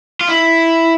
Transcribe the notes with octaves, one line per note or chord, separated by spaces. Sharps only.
F4
E4